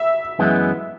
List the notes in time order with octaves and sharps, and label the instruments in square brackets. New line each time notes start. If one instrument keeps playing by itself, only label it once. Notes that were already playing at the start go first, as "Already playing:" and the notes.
Already playing: [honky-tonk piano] E5
[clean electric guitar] F#2 E3 G#3 B3